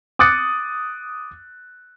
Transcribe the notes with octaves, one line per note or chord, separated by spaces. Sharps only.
D6 D#6 F#6 A6 C#7